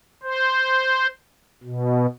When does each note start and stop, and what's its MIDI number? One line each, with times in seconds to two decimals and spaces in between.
0.23 1.07 72
1.63 2.06 47